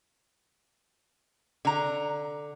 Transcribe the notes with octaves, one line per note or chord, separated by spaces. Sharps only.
D3 A#5